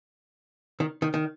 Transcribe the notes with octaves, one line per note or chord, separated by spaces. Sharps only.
D#3
D#3
D#3